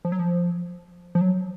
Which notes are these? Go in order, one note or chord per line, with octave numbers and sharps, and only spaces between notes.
F3
F#3
F3
F3
F#3